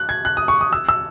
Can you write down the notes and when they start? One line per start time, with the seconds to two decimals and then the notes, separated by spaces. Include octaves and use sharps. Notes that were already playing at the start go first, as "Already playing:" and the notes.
Already playing: F#6
0.09 G#6
0.25 F#6
0.37 D#6
0.48 C#6
0.61 D#6
0.73 E6
0.89 E6